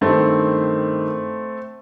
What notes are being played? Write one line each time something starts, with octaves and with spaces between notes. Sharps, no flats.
G2 D#3 A3 C4